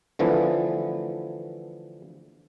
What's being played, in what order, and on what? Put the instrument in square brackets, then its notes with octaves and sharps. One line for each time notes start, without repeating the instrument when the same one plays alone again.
[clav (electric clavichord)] D3 E3 F3 A3 B3